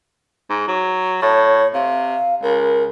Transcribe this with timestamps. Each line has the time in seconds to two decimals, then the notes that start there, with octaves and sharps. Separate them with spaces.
0.50 G#2
0.68 F#3
1.22 A2 C#5
1.74 C3 F5
2.43 C#2 A#4